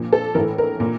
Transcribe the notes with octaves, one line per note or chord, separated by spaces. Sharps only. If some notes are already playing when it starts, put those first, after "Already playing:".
Already playing: A#2 F3
A4
A2 E3 A#4
A#4
A#2